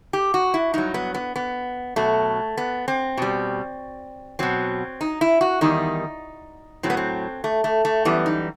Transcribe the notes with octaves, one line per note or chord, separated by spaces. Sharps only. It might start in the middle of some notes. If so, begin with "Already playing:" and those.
G4
F#4
E4
G2 F#3 D#4
B3
B3
B3
B2 F#3 A3
B3
C4
B2 G3
B2 F#3 C4
D#4
E4
F#4
E2 D#3 G3 D#4
A2 F#3 C4
B3
C4
A3
A3
A3
F#2 E3 G3 B3
D#4